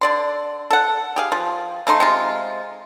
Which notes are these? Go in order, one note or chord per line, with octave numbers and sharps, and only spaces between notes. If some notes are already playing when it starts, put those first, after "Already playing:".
D3 D5 C6
A4 F#5
G4 G#4 F5
F3
C#3 A3 D#4 C6
C3 G#3 F4